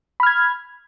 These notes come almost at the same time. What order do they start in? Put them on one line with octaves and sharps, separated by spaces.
B5 F6 G#6